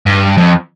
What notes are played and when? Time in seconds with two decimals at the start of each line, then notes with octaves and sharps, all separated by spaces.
0.06 G2
0.37 F2